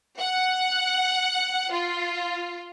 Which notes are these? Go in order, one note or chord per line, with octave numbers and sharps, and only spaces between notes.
F#5
F4